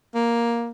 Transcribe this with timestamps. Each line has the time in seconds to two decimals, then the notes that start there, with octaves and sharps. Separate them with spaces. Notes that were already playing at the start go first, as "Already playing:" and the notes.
0.15 A#3